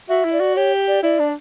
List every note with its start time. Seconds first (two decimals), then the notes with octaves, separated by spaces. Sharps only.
0.09 F#4 E5
0.25 E4
0.33 D5
0.41 F#4
0.56 G4 C#5
0.88 D5
1.03 E4 D5
1.19 D4